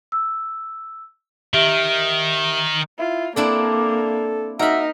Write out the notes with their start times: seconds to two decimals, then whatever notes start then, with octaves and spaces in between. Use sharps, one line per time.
0.12 E6
1.54 D#3 G4 E5 D7
2.99 E4 F4
3.36 A#3 C4 D4 E4 A4 D5
4.59 D#4 F#4 A#4 E5 B5